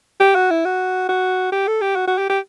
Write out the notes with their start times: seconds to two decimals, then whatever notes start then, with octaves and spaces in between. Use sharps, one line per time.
0.20 G4
0.35 F#4
0.51 E4
0.65 F#4
1.09 F#4
1.52 G4
1.68 A4
1.81 G4
1.96 F#4
2.08 F#4
2.18 G4
2.30 G4